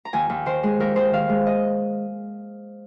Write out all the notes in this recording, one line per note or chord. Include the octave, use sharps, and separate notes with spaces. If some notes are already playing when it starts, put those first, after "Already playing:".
A#5
D#2 G#5
D#2
D#3 C5
G#3 G#4
D#2 A#4
D#2 C5
D#3 F5
G#3
D#5